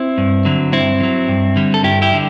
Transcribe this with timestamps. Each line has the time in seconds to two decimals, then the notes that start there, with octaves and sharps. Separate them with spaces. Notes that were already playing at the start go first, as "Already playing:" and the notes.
Already playing: C4 E4
0.18 G2
0.45 D3 F#3
0.72 G2 C4 E4
1.00 D3
1.03 F#3
1.28 G2
1.56 D3 G3
1.74 A4
1.83 G2 E4 G4
2.02 E4 G4
2.12 D3 G3